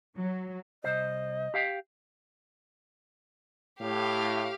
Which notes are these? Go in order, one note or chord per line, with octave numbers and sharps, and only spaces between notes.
F#3
C2 C5 D#5
G4 F5 G5
A2 G4 F5